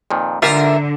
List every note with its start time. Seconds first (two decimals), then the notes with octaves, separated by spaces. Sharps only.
0.11 F2 A#2 D#3
0.42 G#2 D3 G3 F4 A#4 E5